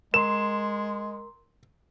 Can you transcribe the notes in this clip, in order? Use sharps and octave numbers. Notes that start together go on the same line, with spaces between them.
G#3 A#4 C6 E7